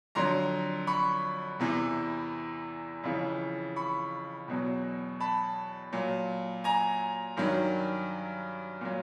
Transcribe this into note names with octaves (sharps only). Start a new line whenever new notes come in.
F2 D3 F#3 A#5 C6
B5 C#6
E2 C3 E3
F2 C#3 E3
B5 C#6
E2 B2 F#3
A5 B5
A#2 F#3
G#5 A#5
G2 D#3 F#3
A#2 F#3